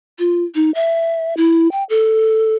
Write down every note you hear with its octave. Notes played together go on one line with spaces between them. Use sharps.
F4
D#4
E5
E4
G5
A4